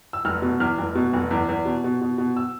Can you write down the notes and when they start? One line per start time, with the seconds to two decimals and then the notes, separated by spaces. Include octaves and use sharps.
0.13 E6
0.25 F1 F6
0.42 B2
0.60 E2 F6
0.78 F1
0.95 B2
1.13 F1
1.31 E2
1.49 E2
1.65 B2
1.84 B2
2.01 B2
2.18 B2
2.36 E6